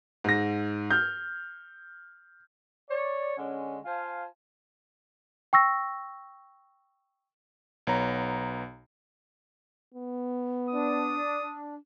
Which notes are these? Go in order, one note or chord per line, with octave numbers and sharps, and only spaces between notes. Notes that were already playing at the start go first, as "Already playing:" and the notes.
G#2 A#6
F6 G6
C#5 D5
D3 G#3 C#4
F4 C5 F5 G#5 A5
G5 C#6 E6 A#6
B1 B3 C#5 A#5
B3
D4 D#6